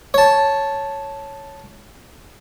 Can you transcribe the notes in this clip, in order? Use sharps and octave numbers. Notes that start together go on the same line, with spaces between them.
C#5 A5